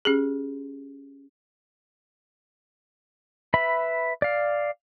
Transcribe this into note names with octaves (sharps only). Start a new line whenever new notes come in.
C#4 G4 G#4
B4 E5 B5
D5 F5